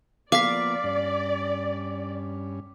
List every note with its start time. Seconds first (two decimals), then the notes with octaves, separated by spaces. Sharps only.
0.32 F3 A#3 B3 D5 F5 D6 B6
0.84 G2 C#4